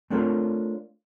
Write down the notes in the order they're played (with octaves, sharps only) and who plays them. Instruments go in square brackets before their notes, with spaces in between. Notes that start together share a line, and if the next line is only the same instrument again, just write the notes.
[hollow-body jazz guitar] A3 C4 D4 F4 A#4 C#5